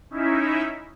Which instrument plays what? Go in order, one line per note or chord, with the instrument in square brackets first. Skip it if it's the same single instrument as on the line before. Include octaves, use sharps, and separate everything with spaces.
[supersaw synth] C#4 D#4 E4 E5